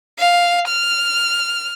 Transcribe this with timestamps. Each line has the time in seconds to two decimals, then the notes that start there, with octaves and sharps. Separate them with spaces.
0.19 F5
0.68 F6